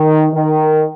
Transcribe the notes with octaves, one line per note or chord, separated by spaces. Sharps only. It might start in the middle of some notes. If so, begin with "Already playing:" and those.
Already playing: D#3
D#3